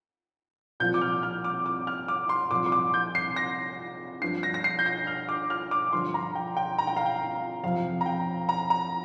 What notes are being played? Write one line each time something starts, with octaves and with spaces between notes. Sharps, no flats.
C2 A#2 F3 G6
D6
F6
F6
D6
D6
F6
D6
C6
C2 A#2 F3 D6
C6
D6
G6
C7
A#6
G2 F3 C7
A#6
A#6
C7
G6
A#6
F6
D6
F6
D6
G2 D3 F3 C6
A#5
G5
G5
A#5
G5
F5
G5
F2 C3 F3 F5
A#5
G5
A#5
A#5